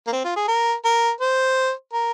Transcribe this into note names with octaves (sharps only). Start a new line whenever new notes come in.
A#3
C4
F4
G#4
A#4
A#4
C5
A#4